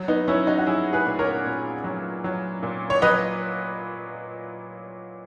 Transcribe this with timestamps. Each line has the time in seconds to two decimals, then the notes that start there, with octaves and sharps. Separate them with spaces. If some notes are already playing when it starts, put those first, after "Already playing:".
Already playing: F#3
0.08 B3 D#4
0.28 F#3 C#4 E4
0.47 D#4 F#4
0.58 F#4
0.66 F#3 E4 G#4
0.93 G#4 B4
1.06 A#2
1.19 A#4 C#5
1.45 A#2
1.84 F#3
2.24 F#3
2.63 A#2
2.90 C#5
3.02 F#3 B4 D#5